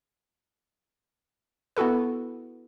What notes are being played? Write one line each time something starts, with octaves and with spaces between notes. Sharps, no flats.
B3 E4 F#4 A4 B4